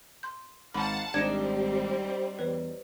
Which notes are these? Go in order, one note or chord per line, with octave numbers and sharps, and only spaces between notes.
C6 G6
G#1 G#2 F5 F#5 A5 B5
G#1 G3 C4 D4 D#4 G#6 C#7 E7
E2 B4 C#5